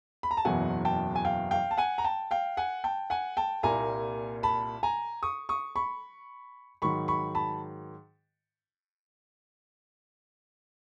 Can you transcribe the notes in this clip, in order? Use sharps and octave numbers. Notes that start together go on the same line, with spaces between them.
B5
A#5
A5
F#1 E2 B2 F#3 F#5 G#5
G5 A5
G#5
F5 G5
F5 G5
A5
F#5 G#5
A#5
G5 A5
F5 G5
F#5 G#5
G5 A5
F#5 G#5
G5 A5
C2 A#2 G3 A#3 G#5 A#5
A5 B5
G#5 A#5
C#6 D#6
C#6 D#6
B5 C#6
G#2 D#3 F#3 B5 C#6
B5 C#6
A5 B5